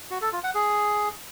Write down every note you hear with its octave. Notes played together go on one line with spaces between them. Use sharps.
F#4
A4
F4
F#5
G#4